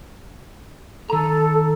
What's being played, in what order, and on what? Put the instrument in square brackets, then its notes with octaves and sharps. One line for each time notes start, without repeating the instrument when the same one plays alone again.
[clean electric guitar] D#3 A#5 [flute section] A4